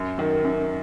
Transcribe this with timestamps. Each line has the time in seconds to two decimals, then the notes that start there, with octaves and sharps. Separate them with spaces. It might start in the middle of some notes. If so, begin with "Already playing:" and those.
Already playing: F#2
0.18 D#3 F#3
0.44 F#2